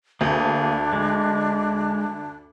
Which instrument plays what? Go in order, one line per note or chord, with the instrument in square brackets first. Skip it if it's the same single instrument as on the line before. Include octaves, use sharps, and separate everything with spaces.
[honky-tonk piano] D2 [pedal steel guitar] A#3 G#4 [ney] D4
[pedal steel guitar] G#3